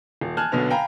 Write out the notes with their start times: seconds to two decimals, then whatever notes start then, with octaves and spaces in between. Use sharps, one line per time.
0.21 D#1
0.37 G#5 A5 F6 F#6 G#6
0.52 B1 B2 D3 B3 F6 F7
0.70 F5 G5 G#5 A#5 B5